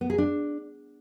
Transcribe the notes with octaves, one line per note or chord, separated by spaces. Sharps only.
B3
G#4
D4